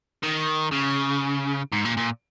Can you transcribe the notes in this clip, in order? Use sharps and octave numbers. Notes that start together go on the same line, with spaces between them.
D#3
C#3
G#2
A#2
A#2